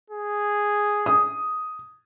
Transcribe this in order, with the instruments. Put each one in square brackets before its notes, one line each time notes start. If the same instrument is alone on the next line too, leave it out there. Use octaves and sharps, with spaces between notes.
[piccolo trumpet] G#4
[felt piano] D#6